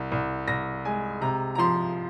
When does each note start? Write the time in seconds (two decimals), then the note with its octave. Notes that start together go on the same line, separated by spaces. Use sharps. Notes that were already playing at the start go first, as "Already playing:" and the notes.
Already playing: C2
0.12 C2
0.47 C2 A#6
0.85 G#3 G#5
1.21 C3 A#5
1.55 A#5
1.58 F3 C6